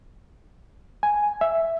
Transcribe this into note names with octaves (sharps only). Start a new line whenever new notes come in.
G#5
E5